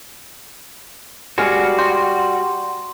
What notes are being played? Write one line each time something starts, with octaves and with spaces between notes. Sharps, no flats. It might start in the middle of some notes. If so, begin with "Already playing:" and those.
G3 G#3 F#4 F6 C#7
G5 C6